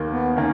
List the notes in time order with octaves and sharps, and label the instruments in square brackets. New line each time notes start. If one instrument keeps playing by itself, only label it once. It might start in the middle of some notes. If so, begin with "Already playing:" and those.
Already playing: [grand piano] D#2 D#3 A#3
[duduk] B3
[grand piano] D#3 A#3 [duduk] C#4